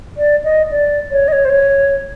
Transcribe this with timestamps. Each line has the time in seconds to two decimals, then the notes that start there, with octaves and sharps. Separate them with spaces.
0.17 D5
0.44 D#5
0.71 D5
1.11 C#5
1.28 D#5
1.33 C#5
1.45 C5
1.50 C#5